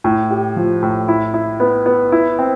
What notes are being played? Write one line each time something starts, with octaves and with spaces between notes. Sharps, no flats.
A2
G4
F3
A2
E4
E4
B3
B3
E4
C4